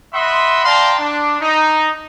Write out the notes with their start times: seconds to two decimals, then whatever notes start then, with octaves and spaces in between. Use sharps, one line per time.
0.13 D#5 E5 F#5 B5 C6
0.65 D5 F5 G5 A5 A#5 C6
0.99 D4
1.40 D#4